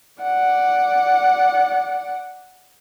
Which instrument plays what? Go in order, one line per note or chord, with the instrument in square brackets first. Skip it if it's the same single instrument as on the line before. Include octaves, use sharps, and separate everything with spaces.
[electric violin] D5 F#5